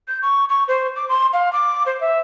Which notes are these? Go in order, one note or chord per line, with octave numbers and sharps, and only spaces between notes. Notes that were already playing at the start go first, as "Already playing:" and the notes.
G6
C#6
C#6
C5
D6
C6
F5
D6
C5
E5